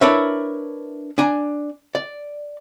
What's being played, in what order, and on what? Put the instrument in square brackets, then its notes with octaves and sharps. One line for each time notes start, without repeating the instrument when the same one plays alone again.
[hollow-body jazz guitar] D4 E4 A#4 B4 C#5 E5
D4 G#5 A#5
D5